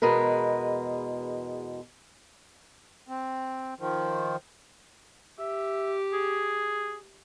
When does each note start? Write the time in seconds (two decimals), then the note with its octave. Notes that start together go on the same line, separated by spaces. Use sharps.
0.02 E2 B2 G#3 A#4 B4
3.08 C4
3.79 D#3 F3
5.39 G4 E5
6.13 G#4